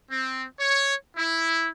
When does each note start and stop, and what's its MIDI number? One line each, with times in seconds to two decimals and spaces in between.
0.10 0.43 60
0.60 0.94 73
1.16 1.67 64